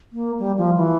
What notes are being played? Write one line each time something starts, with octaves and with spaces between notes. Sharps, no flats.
A#3
G3
F3
E3